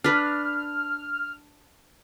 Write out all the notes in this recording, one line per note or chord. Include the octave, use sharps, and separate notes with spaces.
D4 B4 F6